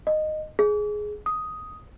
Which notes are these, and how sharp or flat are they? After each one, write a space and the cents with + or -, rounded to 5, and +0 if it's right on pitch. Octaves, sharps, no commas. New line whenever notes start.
D#5 -10
G#4 +10
D#6 +5